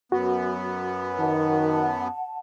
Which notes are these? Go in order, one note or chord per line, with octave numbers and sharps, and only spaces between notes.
F#2 B3 F#4
D#3 F#5 A5